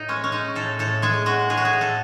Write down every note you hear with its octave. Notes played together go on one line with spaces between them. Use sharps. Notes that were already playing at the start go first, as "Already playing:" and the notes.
Already playing: A2 D#4
G#3 C#4
C#4
G#3 D#4
A2 A4
A2 A4
G#3 G#4
G#3 F#4
A2 G#4
F#4
G#4
A2
A4